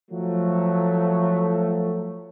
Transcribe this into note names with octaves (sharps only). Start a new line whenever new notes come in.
F3 F#3 A3